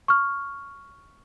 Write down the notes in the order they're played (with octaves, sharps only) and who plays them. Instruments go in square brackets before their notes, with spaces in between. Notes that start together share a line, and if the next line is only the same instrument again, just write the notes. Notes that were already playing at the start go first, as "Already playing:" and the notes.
[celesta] C#6 F6